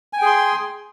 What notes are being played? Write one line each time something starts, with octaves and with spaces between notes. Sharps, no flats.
G#4 G5 G#5 C6